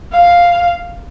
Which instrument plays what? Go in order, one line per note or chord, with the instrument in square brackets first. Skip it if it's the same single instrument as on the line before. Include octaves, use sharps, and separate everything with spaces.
[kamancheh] F5